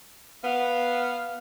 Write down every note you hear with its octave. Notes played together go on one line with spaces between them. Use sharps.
B3 F5